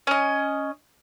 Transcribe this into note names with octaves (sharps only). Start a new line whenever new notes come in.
C#4 D#5